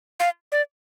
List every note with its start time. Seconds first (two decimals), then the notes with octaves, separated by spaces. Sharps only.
0.20 F5
0.52 D5